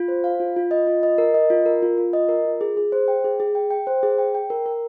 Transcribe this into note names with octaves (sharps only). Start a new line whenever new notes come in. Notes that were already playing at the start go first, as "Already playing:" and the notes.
Already playing: F4
C5
F5
F4
F4
D#5
F4
D#5
A#4
D#5
F4
A#4
F4
F4
D#5
A#4
F4
G#4
G#4
C5
G5
G#4
G#4
G5
G5
C5
G#4
G5
G5
A#4
A#4